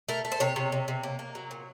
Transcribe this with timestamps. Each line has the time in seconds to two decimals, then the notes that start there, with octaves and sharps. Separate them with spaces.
0.08 A3 A#4
0.25 A3
0.32 C5
0.40 C3 C#5
0.56 C3
0.72 C3
0.88 C3
1.03 A#3
1.19 A#3
1.35 F#3
1.51 A#2